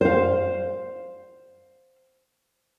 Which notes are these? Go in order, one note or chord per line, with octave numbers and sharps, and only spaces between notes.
C5 F5